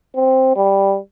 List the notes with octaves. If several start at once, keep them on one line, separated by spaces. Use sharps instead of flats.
C4
G3